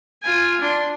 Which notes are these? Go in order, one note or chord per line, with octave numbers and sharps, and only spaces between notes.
F4 G#5
D4 C6